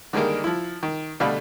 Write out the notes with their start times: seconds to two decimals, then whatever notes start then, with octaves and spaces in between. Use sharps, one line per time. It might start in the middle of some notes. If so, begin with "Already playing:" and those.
0.13 D3 D#3 G3 G#3 A#3
0.44 F3 E4
0.83 D#3
1.20 B2 D3 G3 A3 F5 B5